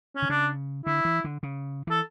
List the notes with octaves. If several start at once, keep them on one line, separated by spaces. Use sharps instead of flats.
C#4
D3
C#3 D4
D3 E4
E3
D3
C#3
E3 A4